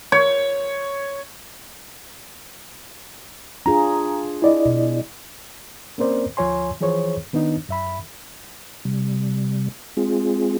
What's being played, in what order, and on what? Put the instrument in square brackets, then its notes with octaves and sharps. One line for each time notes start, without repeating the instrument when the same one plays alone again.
[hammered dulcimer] C#5
[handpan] D4 F4 G#4 [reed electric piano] A#5
[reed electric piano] E4 D5 D#5
[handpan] B2
[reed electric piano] A#3 C4 C#4 A#4 C5 D5
D2 F3 F4 C#5 G#5 C6
E3 F3 G#4 C5 C#5
D#3 B3 D4 D#4
F#2 E5 B5
[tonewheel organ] C3 G3
G#3 C4 F4 G#4